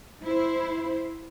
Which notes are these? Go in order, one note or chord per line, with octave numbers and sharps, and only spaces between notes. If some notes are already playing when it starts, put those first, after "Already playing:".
E4 C5